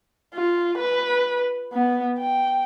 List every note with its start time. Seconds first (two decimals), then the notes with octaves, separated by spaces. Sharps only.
0.34 F4
0.78 B4
1.73 B3
2.18 G5